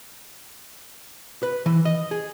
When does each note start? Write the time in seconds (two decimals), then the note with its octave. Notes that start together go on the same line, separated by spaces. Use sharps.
1.43 B4
1.66 E3
1.85 D#5
2.11 G#4